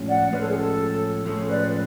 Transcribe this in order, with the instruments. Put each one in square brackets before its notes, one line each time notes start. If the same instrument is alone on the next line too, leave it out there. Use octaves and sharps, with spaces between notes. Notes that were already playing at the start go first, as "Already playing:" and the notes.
Already playing: [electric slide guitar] A2 F3 G#3 C#4
[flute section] D5 F#5
[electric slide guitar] A2 F3 G#3 C#4 [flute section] B4
[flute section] A4
G#4
A4
[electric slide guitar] A2 F3 G#3 C#4 [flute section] A4
[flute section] B4 D5
B4